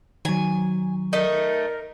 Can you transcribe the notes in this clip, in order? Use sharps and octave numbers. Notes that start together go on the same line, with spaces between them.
D#3 F#3 G#5
A3 D#4 A#4